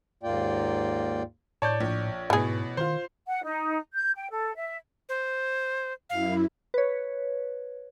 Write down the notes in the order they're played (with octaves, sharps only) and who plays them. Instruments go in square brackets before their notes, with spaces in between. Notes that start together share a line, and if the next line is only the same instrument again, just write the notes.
[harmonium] D#2 G#2 A#3 F4 D5 G5
[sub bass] A2 [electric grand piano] C#5 D5 [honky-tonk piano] A5 G6
[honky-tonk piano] A#1
[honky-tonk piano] A1 B2 [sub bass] G#2 [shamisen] E3 G#4
[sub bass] D#3 [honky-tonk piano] F4 C6 [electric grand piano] C5
[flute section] F#5
D#4
G6
G5
A4
E5
[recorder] C5
[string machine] F#2 E4 [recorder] F5
[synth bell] B4 C#5